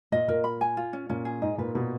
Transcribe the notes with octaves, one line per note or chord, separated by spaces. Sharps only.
A#2 D#5
A#2 A#4
B5
G#5
F4
C#4
A#2 C#4
G#4
G#2 D#5
A#2 B4
B2 B4